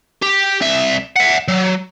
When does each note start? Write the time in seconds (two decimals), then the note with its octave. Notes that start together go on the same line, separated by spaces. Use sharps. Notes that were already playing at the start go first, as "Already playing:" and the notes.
0.22 G4
0.61 C2 E5
1.16 E5 F#5
1.48 F#3